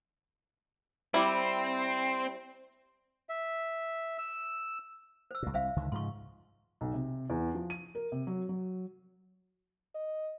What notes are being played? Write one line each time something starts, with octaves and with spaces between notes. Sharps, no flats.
G3 C4 E4
E5
E6
C5 E6
C#2 A#2
C2 C5 E5 F5
C#2 D3 D#3
G#2 C#3 F3 C6 C#6
B1
C3
E2
F3
D#7
A#4
C3
F#3
F#3
D#5